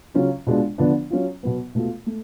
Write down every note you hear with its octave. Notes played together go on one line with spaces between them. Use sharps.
C#3 F#3 C#4 F4
B2 G#3 D4 F4
D3 F3 B3 D4
F#3 C#4 F4
B2 F#3 B3
B2 A3 F4
A3